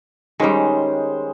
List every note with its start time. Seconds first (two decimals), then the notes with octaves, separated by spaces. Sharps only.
0.40 D#3 G3 G#3 C#4 C5